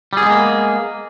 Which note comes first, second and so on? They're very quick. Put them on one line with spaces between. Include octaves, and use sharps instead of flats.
G3 G#4 B3 G#3 A#3